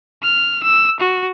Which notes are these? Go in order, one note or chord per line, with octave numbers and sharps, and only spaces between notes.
F6
E6
F#4